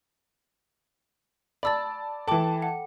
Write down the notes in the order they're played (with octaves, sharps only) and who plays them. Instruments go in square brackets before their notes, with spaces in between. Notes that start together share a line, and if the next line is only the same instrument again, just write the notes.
[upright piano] D5 A5 [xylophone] B5 E6 A6
[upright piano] E3 A5 [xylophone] A4 G5 D6
[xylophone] F#5